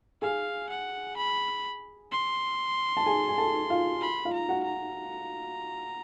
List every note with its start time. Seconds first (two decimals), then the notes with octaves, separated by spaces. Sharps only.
0.22 G#4 F5 G#5
0.69 F#5
1.17 B5
2.12 C6
2.97 A5
3.06 G#4 G#5
3.29 G#5
3.38 A4 A5
3.70 F4 F5
4.02 B5
4.25 F4 F5
4.33 A#5
4.49 F#4 F#5
4.64 A#5